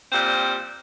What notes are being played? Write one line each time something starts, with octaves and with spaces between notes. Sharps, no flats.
A#2 G3 C4